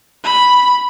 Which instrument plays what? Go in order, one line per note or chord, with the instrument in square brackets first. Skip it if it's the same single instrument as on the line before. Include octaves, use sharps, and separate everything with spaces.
[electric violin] B5